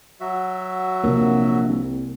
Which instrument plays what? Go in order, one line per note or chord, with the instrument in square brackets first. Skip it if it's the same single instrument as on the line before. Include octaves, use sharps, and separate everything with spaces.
[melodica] F#3 F#4 E5
[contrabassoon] A#1 [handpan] C3 A#3
[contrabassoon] C2